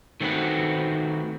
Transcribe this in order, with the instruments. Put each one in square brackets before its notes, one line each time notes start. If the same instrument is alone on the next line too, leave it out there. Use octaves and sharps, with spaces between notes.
[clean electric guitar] D#3 A3 C4 F#4 B4